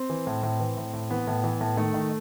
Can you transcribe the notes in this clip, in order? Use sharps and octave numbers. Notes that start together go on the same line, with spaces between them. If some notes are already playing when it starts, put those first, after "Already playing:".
Already playing: C4
E3
A2
A2
E3
A2
A2
E3 B3
A2
E3
A2
D#3 A3
D#3